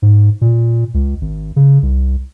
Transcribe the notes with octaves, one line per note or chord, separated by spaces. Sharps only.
G#2
A#2
C#2
G#1
C#3
C2